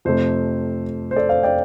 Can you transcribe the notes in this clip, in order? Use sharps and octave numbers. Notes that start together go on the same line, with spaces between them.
F2 C3 A3 C5
C5
A4 D5
C5 F5
D5 G5